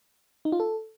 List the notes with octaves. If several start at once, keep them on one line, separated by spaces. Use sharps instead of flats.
D#4
F4
A4